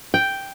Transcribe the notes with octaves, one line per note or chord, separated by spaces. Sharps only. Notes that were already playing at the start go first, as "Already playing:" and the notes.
G5